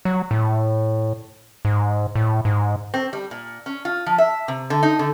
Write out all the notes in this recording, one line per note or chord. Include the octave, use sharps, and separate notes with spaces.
F#3
A2
G#2
A2
G#2
C4
G3
A#2
C#4
F4
F3
E5
C3
D3
D#4
D3